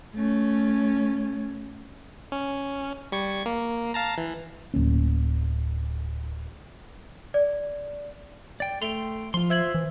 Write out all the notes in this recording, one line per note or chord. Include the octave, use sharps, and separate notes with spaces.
A3 C#4
C#4
G3 C#6 G#6
A#3
F5 A5 A#5
E3
D1 A#2 A#3 C#4
D5
D5 G5
A3 G5 C6 F7 G7
F3 F4 C6 G7
C5 E5 G#6 F#7
E3